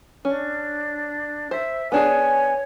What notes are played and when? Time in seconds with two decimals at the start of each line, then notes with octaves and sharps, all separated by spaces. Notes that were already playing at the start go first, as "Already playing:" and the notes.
0.25 C#4 D4
1.51 C5 E5
1.92 B3 D4 G#4 C#5 G#5